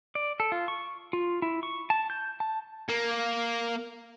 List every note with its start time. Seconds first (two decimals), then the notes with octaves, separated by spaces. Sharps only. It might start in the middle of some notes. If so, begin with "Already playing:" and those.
0.15 D5
0.40 A4
0.52 F4
0.68 C#6
1.13 F4
1.42 E4
1.63 C#6
1.90 A5
2.10 G6
2.40 A5
2.89 A#3